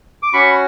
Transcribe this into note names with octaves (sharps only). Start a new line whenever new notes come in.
D6
C#4 F#4 B5 C#6